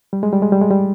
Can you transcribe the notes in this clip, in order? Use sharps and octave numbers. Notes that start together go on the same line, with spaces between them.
G3
G#3
G3
G#3
G3
G#3
G3